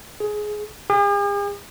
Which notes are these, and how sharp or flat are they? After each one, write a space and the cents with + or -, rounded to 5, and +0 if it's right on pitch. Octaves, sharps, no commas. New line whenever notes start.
G#4 +15
G#4 -45